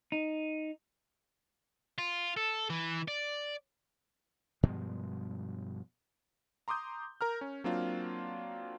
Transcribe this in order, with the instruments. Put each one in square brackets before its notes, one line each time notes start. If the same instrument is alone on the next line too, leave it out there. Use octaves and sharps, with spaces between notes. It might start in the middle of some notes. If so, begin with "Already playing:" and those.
[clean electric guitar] D#4
[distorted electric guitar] F4
A4
E3
D5
[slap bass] G2 B2 F3 G#3
[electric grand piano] A#5 C6 D6 D#6 G6
A#4 A#5 F6
C#4
F#3 A#3 C4 D4 F4